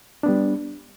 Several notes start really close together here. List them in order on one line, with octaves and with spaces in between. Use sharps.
D4 B3 G3